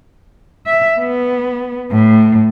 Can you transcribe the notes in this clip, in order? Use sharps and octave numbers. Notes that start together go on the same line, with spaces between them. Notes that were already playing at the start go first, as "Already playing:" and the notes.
E5
B3
A2